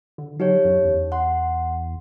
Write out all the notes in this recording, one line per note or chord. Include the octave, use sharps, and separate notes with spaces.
D3
F#3 D#4 G4 C#5
F#2
E2
F#5 C6